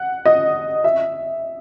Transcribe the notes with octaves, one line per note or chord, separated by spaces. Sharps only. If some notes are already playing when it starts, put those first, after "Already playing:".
Already playing: F#5
D#5
E5